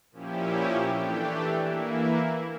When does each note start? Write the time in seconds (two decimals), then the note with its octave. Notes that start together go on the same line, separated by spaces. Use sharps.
0.11 A#2 F3 C#4 E4 G4
0.84 E3 A3 D4 G4
1.57 E3 A#3 E4